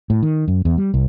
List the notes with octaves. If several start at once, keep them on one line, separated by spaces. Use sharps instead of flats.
A2
D#3
F#2
E2
G3
C2